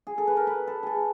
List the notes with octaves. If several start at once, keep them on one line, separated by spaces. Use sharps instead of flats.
G#4
A4
B4
A#4
B4
A4
G#4 A4